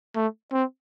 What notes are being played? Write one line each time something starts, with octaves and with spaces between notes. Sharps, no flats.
A3
C4